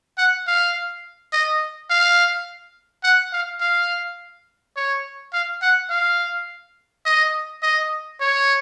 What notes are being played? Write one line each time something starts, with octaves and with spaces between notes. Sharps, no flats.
F#5
F5
D#5
F5
F#5
F5
F5
C#5
F5
F#5
F5
D#5
D#5
C#5